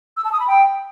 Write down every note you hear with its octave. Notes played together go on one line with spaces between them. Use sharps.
E6
A5
D#6
B5
G5